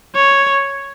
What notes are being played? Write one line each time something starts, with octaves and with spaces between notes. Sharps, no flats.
C#5